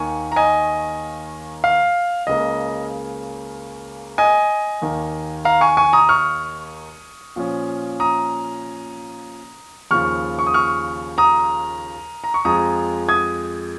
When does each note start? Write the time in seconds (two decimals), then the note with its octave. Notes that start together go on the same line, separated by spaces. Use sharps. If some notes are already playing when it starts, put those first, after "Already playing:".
Already playing: D#2 D#3 A#3 G#5 C#6
0.32 A#5
0.36 D#5 G#5
1.64 F5
2.27 C#2 C#3 A#3 D#5
4.18 D#5 G#5
4.82 D#2 D#3 A#3
5.45 F5 A#5
5.61 G#5 C#6
5.77 G#5 C#6
5.93 A#5 D#6
6.09 C#6 F6
7.36 A#2 F3 C#4
8.00 A#5 D#6
9.91 D#2 C#3 F3 C#6 F6
10.39 C#6
10.47 D#6
10.54 C#6 F6
11.18 A#5 D#6
12.24 A#5
12.34 C#6
12.45 F2 F3 G#3 A#5 D#6
13.09 D#6 G#6